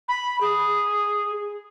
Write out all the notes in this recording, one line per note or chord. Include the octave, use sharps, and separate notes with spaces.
B5
G#4